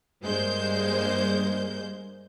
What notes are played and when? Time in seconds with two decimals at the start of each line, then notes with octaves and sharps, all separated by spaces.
0.24 G2 G#3 A#3 C5 G6